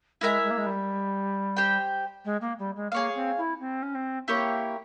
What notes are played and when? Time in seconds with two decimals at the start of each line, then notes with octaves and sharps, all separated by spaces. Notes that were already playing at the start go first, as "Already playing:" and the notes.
0.21 G#3 E4 A#4 E5 G#5
0.43 G#3
0.50 A#3
0.57 G#3
0.66 G3
1.57 G4 C5 G5
2.25 G#3
2.41 A#3
2.58 G3
2.76 G#3
2.92 A#3 G#4 C#5 F5
3.15 C4
3.37 E4
3.60 C4
3.82 C#4
3.94 C4
4.27 A#3 E4 G4 A#4 C#5